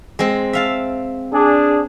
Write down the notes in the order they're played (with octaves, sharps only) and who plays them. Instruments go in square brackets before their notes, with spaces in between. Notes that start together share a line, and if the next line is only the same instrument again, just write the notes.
[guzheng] G#3 C4
E5 F5 A5
[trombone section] D4 G#4